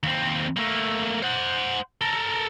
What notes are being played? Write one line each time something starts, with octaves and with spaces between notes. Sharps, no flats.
D#2 C4
A3 A#3
C5 F#5
A4 A#4